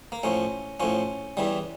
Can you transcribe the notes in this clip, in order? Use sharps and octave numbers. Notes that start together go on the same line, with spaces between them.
A#3
A2 F3 C#4
A2 F3 C#4
E2 E3 G3